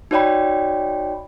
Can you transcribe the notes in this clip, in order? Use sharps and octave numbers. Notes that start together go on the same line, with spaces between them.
D#4 F#4 C#5 D5 G5 B5